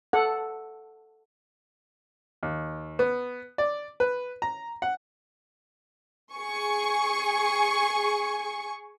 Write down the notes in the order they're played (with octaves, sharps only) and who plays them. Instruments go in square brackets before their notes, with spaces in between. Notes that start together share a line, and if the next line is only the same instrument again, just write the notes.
[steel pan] A4 F#5
[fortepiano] D#2
B3
D5
B4
A#5
F#5
[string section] G#4 G#5 C#6